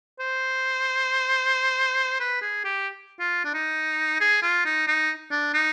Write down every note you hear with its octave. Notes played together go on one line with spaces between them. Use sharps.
C5
B4
G#4
G4
F4
D4
D#4
G#4
F4
D#4
D#4
D4
D#4